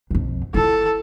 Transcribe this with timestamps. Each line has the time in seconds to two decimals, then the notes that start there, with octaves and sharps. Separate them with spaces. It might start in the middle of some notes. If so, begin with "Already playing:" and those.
0.11 B1 F2
0.54 E4 F4 A4